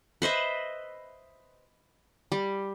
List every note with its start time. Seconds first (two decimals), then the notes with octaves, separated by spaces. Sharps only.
0.22 B4 C5 D#5 E5
2.32 G3